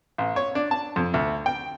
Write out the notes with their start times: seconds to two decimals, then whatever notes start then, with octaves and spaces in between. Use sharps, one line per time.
0.18 A1
0.36 C#5
0.55 D4
0.71 A5
0.96 F2
1.14 D2
1.46 G5